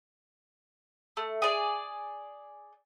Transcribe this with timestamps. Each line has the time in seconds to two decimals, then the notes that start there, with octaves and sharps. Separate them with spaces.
1.17 A3
1.42 G#4 D5